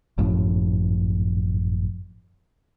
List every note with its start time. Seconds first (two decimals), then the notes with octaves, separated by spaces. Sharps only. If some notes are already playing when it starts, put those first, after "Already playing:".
0.18 G#1 F#2 A2 F3